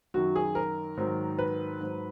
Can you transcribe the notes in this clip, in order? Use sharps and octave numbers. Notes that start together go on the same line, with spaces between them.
F#2 D#3 F#3 F#4
G#4
A#4
G#2 D#3 F#3
B4
G#2 F#3